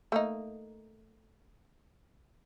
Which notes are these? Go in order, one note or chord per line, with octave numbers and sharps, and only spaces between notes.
A3 A#3 D#4